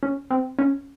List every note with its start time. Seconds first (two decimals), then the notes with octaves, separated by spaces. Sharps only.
0.03 C#4
0.31 C4
0.59 C#4